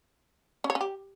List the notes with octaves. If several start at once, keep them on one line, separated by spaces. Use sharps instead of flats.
C#4
C#5
C#4
G4